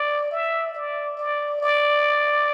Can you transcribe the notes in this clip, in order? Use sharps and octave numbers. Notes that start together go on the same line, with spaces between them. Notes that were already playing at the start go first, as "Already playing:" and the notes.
Already playing: D5
E5
D5
D5
D5